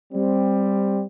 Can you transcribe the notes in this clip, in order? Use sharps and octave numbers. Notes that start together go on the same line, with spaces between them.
G3 C4